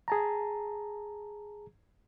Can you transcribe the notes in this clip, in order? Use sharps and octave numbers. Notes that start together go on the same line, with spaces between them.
G#4 A5 A#5